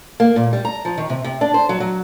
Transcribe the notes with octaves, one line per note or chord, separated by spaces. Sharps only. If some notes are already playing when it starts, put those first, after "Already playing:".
A#3
A#2
G3
A#5
F3
D#3
C3
C3
D4
C5
F#3
F#3